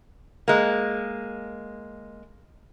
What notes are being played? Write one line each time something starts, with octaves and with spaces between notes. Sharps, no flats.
G#3 A#3